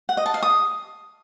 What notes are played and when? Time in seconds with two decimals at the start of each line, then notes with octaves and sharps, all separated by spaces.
0.09 F#5
0.17 D#5
0.26 A5
0.34 F5
0.43 D#6